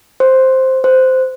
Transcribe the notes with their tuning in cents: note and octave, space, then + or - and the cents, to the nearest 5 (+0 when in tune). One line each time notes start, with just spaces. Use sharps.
C5 +5
C5 -10